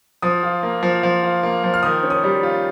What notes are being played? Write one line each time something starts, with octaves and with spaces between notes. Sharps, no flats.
F3 D#6
F4
A#3
F3
F3
F4
A#3
F3
F6
D#3 D#6
C#4
D#6
G3
F4